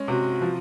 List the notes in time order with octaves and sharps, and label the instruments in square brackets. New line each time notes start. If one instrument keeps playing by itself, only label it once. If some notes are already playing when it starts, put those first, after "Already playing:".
Already playing: [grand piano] G#3 C#4
[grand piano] C3 [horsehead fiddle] F#4
[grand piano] F3